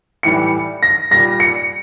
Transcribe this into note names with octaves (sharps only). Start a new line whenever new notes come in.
A2 E3 G3 C#7
A#6
A#2 G3 A#6
C#7